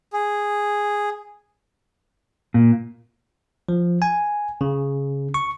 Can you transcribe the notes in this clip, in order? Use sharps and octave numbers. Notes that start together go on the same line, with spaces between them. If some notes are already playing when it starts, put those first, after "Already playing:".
G#4
A#2
F3
G#5
C#3
C#6